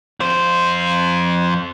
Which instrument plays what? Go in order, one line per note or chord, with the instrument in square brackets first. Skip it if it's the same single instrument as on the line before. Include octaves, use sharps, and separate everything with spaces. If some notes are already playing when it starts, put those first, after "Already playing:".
[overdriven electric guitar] F2 C5